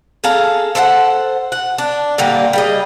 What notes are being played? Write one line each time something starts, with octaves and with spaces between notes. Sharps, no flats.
G#4 A4 F5 A#5
A4 C5 E5 F#5
F#5
D4
A#2 D3 G3 A#3
G3 G#4 D#5